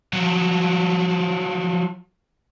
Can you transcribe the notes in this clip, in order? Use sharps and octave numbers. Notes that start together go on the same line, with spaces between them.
F3 F#3